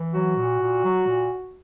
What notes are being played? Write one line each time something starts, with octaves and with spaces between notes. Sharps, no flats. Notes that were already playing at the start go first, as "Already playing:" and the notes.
Already playing: E3
F#3 F#4
A#2
A#2
F#3
A#2